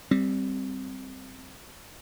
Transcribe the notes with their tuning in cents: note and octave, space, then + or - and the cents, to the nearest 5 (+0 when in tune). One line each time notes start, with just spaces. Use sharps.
G3 +5 C4 +0